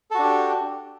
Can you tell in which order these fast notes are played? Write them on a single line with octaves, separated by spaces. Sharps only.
A4 F#4 D4 G4